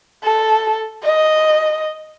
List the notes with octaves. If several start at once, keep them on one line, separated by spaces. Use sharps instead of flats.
A4
D#5